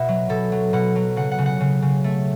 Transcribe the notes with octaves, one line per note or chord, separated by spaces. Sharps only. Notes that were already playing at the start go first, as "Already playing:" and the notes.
Already playing: B2 E5 F#5
F#3
B2 A4
F#3
B2 F#5
F#3
C#3 F#5
F#5
C#3
F#5
C#3
C#3
A3